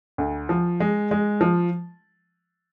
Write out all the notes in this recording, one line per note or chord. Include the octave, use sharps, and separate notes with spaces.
D2
F3
G#3
G#3
F3